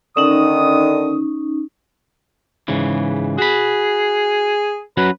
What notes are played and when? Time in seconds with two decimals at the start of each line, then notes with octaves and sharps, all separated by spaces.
0.17 D3 D#3 C#4 D#4 D#6
2.68 G#2 C#3 E3
3.38 F#4 G#4 B5
4.97 F#3 C#4 F#4 B4